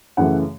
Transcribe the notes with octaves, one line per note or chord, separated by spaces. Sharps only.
F#2 C#3 E3 A3 F#5